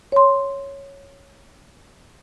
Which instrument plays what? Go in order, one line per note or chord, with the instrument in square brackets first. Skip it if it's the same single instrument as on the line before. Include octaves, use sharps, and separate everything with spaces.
[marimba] C#5 C6